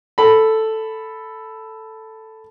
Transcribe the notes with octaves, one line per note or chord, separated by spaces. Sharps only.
A4 B5